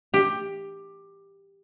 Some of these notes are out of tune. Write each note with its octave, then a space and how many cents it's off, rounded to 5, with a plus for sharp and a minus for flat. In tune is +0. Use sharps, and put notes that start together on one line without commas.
G4 +10